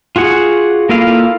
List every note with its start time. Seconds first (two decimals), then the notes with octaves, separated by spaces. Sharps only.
0.16 F4 F#4 G#4 F#5
0.89 A#3 E4 F4 A4 F5